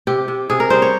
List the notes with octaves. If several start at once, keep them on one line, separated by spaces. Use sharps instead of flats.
C3 G4
C3
C3 G#4
A#4
G3 C5
C#5